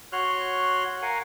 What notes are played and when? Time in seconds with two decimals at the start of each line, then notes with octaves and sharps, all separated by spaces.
0.12 F#4 C#5 C6 F6 F#6
1.02 A#4 F5 F#5 G#5